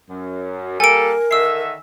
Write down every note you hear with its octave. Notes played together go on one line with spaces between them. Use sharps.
F#2
G3 A#3 A4 A#4 G#5 D7
D3 D#3 E5 E6 C7